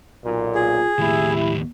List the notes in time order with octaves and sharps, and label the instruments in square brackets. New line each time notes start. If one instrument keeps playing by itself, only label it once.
[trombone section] B1 A#2
[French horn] F4 [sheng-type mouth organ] G#4
[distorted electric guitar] D#2 A2 [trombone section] E4 [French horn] G4